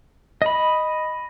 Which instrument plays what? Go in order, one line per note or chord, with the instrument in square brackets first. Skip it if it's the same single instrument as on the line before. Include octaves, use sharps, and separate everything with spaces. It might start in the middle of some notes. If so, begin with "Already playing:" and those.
[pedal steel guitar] D#5 B5